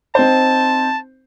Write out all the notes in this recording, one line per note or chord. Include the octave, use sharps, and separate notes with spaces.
C4 D#4 C5 A5